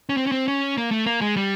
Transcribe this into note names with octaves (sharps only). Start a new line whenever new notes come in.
C#4
C4
C#4
C4
C#4
A#3
A3
A#3
G#3
G3